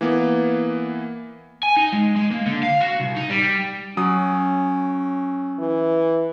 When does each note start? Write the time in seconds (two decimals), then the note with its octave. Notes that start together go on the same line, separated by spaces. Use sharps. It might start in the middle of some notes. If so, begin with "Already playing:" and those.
0.01 E3 A#3 B3
1.63 G#5
1.77 D#4
1.93 G#3
2.16 G#3
2.31 A#3
2.46 D3
2.63 F5
2.80 F#4
3.00 C2
3.16 D#4
3.30 G3
3.97 F#3 C#4 D#6
5.59 E3